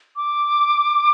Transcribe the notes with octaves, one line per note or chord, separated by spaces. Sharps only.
D6